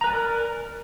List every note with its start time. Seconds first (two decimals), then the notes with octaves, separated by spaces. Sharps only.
0.01 A#5
0.04 B4
0.07 G#5
0.10 D5
0.13 A#4